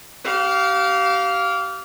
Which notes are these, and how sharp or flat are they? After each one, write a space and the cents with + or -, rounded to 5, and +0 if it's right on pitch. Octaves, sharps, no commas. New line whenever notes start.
G4 -35 F5 +0